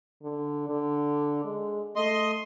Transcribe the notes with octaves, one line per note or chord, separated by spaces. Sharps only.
D3
D3
G#3
A3 D#5 C6